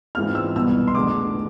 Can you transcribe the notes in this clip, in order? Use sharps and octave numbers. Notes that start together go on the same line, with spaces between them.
G#2 E3 G#3 C4 F4 F6
E6
C2 B2 B3 E6
C6
F1 E2 D3 G#3 D6